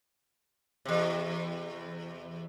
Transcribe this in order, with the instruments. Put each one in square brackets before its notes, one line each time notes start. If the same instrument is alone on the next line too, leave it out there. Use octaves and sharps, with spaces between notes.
[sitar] E2 C3